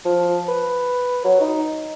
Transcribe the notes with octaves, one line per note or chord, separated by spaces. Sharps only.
F3
B4
F#3
D#4